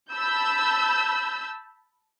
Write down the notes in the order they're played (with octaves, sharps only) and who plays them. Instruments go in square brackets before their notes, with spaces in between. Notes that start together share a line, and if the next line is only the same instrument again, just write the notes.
[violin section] A5 B5 E6 G6